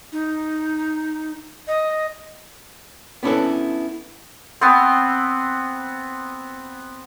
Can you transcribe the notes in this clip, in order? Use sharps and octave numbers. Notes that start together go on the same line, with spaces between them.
D#4
D#5
B3 C#4 D4 E4 A4 B4
B3 C4